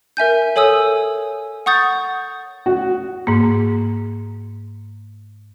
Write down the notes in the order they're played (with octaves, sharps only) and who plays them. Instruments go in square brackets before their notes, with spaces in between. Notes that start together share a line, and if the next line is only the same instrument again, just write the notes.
[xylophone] A#4 E5 G#5 G6
A4 C#5 G#5 D#6 E6
F#5 C#6 D#6 G6 A6
[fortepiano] F#4
[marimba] G#2 A#3